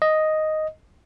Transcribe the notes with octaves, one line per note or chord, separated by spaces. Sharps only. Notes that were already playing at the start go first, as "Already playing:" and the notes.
D#5